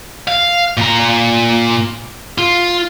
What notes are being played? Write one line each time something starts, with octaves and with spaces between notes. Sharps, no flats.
F5
A#2 A#5
F4